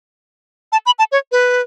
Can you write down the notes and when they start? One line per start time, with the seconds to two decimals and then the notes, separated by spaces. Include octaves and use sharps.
0.72 A5
0.86 B5
0.99 A5
1.12 C#5
1.32 B4